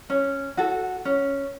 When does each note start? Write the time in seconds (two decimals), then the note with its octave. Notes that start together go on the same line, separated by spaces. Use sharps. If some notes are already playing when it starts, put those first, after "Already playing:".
0.10 C#4
0.57 F#4 A4
1.05 C#4